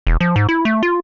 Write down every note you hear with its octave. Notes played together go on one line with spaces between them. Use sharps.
E1
F3
G#2
E4
A3
F4